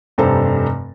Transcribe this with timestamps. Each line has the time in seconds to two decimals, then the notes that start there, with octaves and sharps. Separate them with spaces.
0.18 F1 G2 A4 C5 A#5